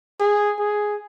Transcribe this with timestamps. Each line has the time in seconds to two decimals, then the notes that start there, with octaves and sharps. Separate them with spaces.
0.20 G#4
0.59 G#4